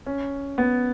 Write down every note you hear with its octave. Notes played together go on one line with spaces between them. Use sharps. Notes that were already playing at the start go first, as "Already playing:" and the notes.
C#4
B3